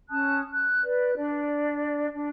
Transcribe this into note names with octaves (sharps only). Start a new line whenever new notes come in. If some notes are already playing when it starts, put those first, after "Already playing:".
C#4 A5 D#6 F#6
F#6
B4 D5
D4 D5
D4